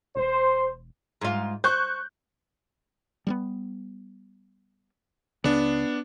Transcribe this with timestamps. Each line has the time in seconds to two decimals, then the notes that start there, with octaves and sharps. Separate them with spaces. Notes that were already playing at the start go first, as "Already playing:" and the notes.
0.16 E1 C5
1.21 G#2 F4
1.64 C5 C#6 F#6 G6
3.27 G3 A#3 B3
5.44 C#2 C#3 B3 D4